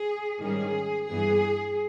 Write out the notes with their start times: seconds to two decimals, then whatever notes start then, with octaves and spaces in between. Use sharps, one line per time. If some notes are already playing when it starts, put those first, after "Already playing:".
Already playing: G#4
0.42 G#2 D#3 G3 C#4 G#4
1.08 G2 E3 G3 B3 G#4